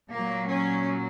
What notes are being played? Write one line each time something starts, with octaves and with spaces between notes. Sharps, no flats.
A#2 F#3 A#3
C#4